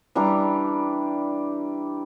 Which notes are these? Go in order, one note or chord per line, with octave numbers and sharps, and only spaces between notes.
E3 G3 D4 A#5